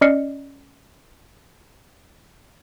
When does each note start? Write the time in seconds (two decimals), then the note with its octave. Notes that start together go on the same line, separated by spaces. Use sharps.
0.01 C#4 D5 D#5 F6 C7 C#7